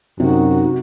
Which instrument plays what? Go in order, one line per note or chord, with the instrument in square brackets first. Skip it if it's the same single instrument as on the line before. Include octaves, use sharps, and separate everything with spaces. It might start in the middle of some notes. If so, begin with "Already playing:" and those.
[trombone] F#2 [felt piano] C3 [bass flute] D#4 [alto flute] F#4